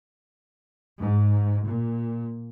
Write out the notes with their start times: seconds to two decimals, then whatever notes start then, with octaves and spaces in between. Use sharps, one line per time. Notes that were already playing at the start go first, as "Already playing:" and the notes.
0.99 G#2
1.66 A#2